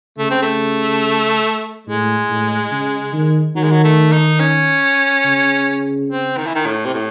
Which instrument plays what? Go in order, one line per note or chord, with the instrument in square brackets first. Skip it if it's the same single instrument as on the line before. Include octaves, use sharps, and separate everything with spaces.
[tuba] C#3 [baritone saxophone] A3
[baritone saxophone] C4
A3
[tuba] A2 [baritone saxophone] G#3
[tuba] A2
C#3
D#3
[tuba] D#3 [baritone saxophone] F#3
[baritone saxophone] G#3
F#3
A3
D#4
C#4
[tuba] C#3
[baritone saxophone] C4
D#3
E3
D#3
A2
C3
A2